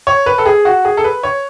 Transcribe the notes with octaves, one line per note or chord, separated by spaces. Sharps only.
C#5
B4
A4
G#4
F#4
G#4
A4
B4
C#5